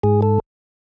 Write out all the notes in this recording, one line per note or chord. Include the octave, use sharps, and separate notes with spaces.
G#2 G#4
A4